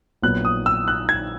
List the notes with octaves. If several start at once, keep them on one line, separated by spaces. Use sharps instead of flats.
A#1 A#2 F#3 B3 F#6
D#6
E6
F#6
G#6